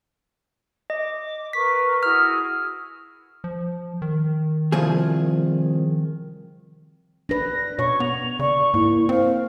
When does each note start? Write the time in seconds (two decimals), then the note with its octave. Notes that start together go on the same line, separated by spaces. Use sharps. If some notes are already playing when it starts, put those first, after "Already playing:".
0.90 D#5 D6
1.53 A#4 B4 C#6 B6
2.03 E4 F#4 G#4 F6
3.44 F3
4.02 D#3
4.72 C2 F3 G#4
7.29 D4 B4 A#6
7.79 B2 C#5 C#6
8.00 B3 F7
8.39 C#3 D5 C#6
8.74 G#2 A#3 E4
9.09 C4 C5 F5